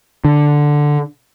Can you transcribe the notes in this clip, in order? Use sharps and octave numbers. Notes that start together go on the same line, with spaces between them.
D3